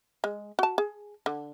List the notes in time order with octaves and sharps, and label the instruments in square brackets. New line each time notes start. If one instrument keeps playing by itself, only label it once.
[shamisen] G#3
F#4 A5
G#4
D3